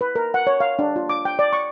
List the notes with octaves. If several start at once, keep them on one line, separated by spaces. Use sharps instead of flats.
B4
A#4
F#5
C#5
F5
D4
F4
D6
G5
D5
C#6